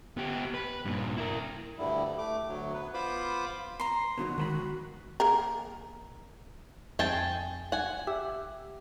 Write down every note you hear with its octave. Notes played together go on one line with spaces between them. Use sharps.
B3 G4
B4
G2 A#2
E4 A#4
D2 G2 D3 G3 E4
A3 D6
D2 F#3
B3 B4
B3 F4 C5 B5 D6
A#5 C6
B2 D#3 F#3 F#4
G#2 D#3 A4 B5
A#3 G#4 A#4
F2 C4 G#4 G5 A5 D7
F#5 G#5
G4 E5 E6